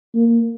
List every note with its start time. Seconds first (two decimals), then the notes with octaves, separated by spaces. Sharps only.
0.15 A#3